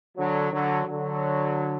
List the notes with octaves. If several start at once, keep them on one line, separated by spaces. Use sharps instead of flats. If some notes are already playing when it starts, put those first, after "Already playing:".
D3 F#3
D3 F#3
D3 F#3